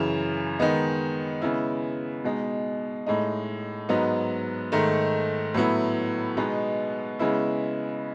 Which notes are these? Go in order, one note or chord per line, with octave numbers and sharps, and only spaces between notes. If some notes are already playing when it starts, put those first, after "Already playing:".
Already playing: F#2 C#3 E3
D#3 G#3 B3 D#4
C#3 G#3 B3 E4
B2 G#3 D#4
A2 G#3 D#4
G#2 F#3 B3 D#4
G#2 D#3 A3
A2 F#3 B3 E4
B2 G#3 B3 D#4
C#3 G#3 B3 E4